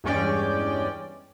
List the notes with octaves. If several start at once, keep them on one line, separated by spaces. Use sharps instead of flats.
E2 G2 G#3 C#4 D5 G5